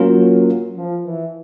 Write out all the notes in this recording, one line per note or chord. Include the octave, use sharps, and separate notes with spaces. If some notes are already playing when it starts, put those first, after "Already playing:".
Already playing: F#3 A#3 C#4 F4 A#4
F3
E3